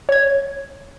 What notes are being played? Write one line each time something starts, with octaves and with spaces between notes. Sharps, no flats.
C#5 G#6